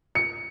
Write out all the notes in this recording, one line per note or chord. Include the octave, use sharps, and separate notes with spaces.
C#7